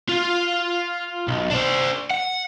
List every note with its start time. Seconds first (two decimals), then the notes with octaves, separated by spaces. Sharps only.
0.09 F4
1.28 B1
1.50 D4 C5
2.11 F#5